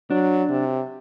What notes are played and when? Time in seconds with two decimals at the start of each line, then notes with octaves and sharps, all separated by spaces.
0.11 F#3 D4
0.50 C3